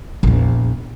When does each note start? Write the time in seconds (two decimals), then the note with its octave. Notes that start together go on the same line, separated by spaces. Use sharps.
0.23 A#1 E2